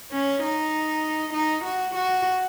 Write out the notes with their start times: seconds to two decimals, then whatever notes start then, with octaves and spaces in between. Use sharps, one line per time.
0.12 C#4
0.43 D#4
1.34 D#4
1.64 F#4
1.95 F#4